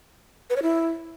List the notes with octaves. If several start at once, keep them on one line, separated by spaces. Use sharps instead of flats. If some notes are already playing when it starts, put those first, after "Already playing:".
B4
C#5
E4